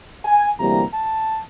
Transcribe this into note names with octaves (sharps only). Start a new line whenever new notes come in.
G#5
D2 C3 E3 G3 A#3 A#5
A5